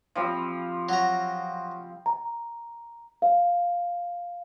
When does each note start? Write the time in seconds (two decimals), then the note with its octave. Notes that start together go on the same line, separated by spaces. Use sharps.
0.15 F3 G3 C4
0.89 F#3 A#5
2.06 A#5
3.22 F5